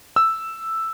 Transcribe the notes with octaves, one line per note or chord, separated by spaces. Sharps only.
E6